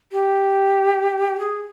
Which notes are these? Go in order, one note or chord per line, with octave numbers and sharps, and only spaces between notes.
G4
G#4